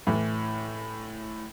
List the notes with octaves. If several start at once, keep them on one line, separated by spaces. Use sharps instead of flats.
A2 E3